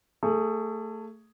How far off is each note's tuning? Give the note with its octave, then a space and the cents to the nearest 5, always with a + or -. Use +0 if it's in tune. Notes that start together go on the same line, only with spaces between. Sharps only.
A3 +20 G#4 +0